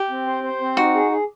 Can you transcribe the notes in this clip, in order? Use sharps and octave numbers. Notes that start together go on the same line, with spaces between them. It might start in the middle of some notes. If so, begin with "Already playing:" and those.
Already playing: G4
C4
C5
C5
C4
D#4 F#4
G#4
G#4